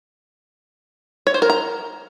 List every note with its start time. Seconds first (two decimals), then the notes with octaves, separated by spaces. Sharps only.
1.27 C#5
1.34 C5
1.42 A#4
1.50 A#5